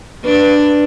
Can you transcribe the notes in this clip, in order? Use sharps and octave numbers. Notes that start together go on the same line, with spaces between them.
D4 B4